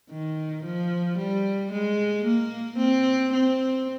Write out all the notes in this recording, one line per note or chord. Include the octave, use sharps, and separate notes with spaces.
D#3
F3
G3
G#3
A#3
C4
C4